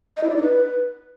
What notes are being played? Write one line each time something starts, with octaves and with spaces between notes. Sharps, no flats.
D#5
E4
D5
D#4
B4